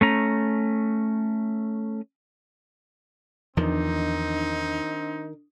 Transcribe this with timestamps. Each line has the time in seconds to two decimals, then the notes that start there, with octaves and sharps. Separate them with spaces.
0.01 A3 C#4 A#5
3.57 E2 D#3 F3 C4 D4 D#4